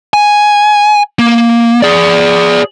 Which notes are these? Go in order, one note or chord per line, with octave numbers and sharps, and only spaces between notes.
G#5
A#3
G#4 D5